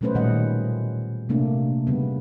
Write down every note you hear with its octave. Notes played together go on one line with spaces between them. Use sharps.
B2 F#3 A3 C#4 B4 C5
A#2 D#3 G3 D#5 F#5
C3 A3 A#3 D4
C#3 G3 B3